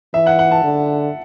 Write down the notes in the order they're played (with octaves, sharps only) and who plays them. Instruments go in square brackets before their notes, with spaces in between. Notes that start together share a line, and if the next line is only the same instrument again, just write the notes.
[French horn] E3 [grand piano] E5
[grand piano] F#5
F#5
A5
[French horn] D3